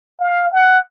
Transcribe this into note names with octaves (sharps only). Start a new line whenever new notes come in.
F5
F#5